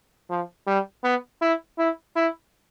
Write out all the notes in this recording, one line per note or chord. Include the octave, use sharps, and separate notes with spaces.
F3
G3
B3
E4
E4
E4